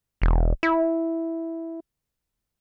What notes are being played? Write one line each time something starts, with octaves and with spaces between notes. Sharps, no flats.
E1
E4